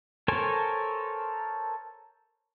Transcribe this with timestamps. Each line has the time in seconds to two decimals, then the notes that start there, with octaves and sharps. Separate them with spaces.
0.28 A4 A#4 C5 C#5 G#5